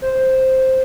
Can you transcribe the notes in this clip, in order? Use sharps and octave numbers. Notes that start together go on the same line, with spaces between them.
C5